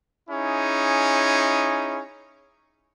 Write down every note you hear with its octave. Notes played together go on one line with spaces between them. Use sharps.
C#4 D#4 E4 G#4